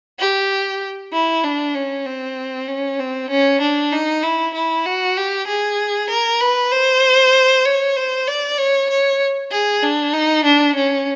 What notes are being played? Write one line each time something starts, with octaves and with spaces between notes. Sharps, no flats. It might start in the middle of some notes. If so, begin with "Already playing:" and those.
G4
E4
D4
C#4
C4
C#4
C4
C#4
D4
D#4
E4
E4
F#4
G4
G#4
A#4
B4
C5
C#5
C5
D5
C#5
C#5
G#4
D4
D#4
D4
C#4